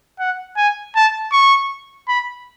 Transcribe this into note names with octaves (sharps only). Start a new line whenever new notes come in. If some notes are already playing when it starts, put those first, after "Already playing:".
F#5
G#5
A5
C#6
B5